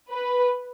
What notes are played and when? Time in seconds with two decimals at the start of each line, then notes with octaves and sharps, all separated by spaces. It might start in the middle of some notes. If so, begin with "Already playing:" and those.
0.11 B4